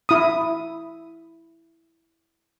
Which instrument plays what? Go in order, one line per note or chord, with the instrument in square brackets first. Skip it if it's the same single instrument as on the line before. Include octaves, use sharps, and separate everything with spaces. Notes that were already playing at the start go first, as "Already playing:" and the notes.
[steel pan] E4 D#6